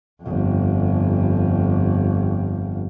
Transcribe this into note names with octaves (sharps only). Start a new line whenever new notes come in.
G1 F2